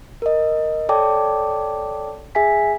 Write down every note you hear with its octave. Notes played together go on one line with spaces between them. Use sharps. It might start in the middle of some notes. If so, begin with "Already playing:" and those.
A#4 D#5
A4 C#5 D5 G5 A5 D6
G#4 E5 G#5 B6